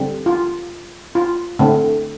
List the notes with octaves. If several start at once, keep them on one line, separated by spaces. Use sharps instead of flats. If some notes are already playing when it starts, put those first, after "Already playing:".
Already playing: D3 G3 C4
F4
F4
D3 A3 C4